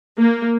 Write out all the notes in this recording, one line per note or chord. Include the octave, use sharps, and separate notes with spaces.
A#3